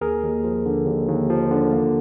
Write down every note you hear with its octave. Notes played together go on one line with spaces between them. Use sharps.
D#2 G#4 A#4
D#2
F3
D3
D#2
D#2
F3
D3
A#3